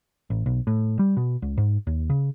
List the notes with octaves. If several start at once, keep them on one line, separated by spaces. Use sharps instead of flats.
A1
B1
A2
G3
B2
C#2
G#2
D#2
C#3